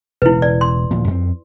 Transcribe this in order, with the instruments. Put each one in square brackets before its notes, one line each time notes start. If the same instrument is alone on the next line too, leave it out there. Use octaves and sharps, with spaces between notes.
[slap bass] E1 C#3 [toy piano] E4 B4
[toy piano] D5
C6
[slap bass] D1 A#2 F3
F2 C4